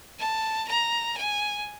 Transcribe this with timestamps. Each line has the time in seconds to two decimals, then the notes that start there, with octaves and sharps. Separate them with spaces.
0.19 A5
0.68 A#5
1.17 G#5